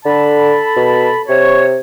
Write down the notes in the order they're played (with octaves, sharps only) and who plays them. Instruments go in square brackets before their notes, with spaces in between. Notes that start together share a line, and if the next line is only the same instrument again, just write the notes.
[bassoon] D3 [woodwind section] A4 A5 B5
[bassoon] B2
[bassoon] C3 [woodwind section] C#5